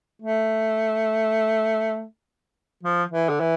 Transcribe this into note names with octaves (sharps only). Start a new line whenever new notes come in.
A3
F3
E3
D3
E3